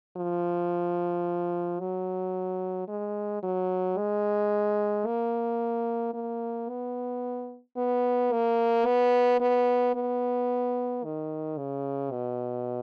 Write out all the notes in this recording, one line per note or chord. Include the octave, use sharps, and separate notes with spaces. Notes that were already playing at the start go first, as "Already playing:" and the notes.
F3
F#3
G#3
F#3
G#3
A#3
A#3
B3
B3
A#3
B3
B3
B3
D#3
C#3
B2